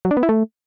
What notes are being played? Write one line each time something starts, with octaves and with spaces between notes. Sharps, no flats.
F#3
D4
B3
E4
A3